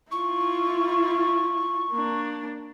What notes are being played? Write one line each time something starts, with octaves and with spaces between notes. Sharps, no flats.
E4 F4 C#6
A#3 D4